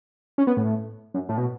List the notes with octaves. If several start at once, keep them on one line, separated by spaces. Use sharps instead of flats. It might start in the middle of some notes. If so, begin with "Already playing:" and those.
C#4
B3
A2
F#2
A2
B2